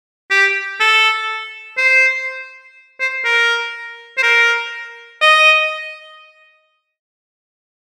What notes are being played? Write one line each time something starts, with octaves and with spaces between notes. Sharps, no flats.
G4
A4
C5
C5
A#4
C5
A#4
D#5